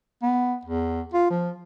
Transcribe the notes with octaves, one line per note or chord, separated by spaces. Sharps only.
B3
E2
F4
F3